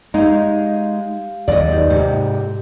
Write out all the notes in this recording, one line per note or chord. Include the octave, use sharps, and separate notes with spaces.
G#3 D#4 G4 F5
D#2 F#3 D5 D#5
D#4 G4 B4
G#2 C3 G4